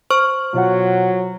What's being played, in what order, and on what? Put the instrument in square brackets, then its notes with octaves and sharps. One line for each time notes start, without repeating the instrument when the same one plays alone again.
[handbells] C5 C#6 F6
[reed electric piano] B2 F4 F#5 [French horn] F#3